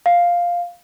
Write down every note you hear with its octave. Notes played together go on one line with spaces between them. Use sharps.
F5